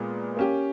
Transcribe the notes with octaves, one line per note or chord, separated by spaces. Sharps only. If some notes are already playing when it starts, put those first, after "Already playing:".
Already playing: A#2 G#3 B3
A#3 C#4 G4